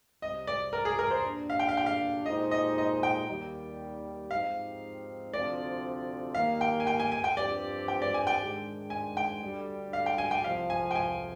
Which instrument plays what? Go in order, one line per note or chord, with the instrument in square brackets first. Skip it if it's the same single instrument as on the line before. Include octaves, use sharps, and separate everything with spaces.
[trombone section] C2 C3 G3 [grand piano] D#5
[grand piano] D5
A#4
G#4
A#4
C5
[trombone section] A#2 G3 D4
[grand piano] F5
G5
F5
G5
F5
[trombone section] A#2 G#3 D#4 G4 C5 [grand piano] D#5
[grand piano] D#5
D#5
G5
[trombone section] D#2 D#3 G3
[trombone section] G#2 F3 C4 D#4 G4 [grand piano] F5
[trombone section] D2 C3 F3 C4 [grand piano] D5
[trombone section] D#3 G3 A#3 [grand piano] F5
[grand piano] G5
G#5
G5
G#5
G#5
G5
[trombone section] G2 F3 C4 G4 [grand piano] D5
[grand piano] G5
D5
G#5
G5
[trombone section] G#2 D#3 G#3 D4
[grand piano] G#5
G5
[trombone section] D2 D3 G3
[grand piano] F5
G5
G#5
G5
[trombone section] C2 C3 F3 [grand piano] F5
[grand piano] G#5
G5
G#5